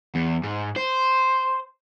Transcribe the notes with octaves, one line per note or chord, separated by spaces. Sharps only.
E2
G#2
C5